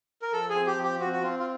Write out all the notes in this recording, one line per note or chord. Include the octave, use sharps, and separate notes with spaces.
A#4
F3 A4
G#4
C4
G4
F3
G4
C4 F#4
F#4
C4 F4
F4